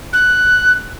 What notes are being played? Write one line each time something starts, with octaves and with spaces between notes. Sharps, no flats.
F#6